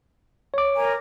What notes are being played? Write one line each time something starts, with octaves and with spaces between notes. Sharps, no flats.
C#5 D6
A#4 G#5 A#5